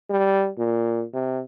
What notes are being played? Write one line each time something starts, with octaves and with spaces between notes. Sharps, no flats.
G3
A#2
C3